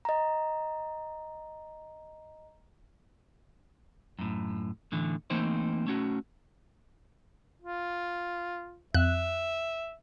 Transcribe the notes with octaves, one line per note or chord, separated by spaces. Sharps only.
D#5 A#5
F#2 A2
A2 D3 E3
E3 A3 A#3 C4 D#4 C5
A3 C#4 F#4
F4
F2 E5 F#6